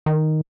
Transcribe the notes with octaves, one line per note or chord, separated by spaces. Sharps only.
D#3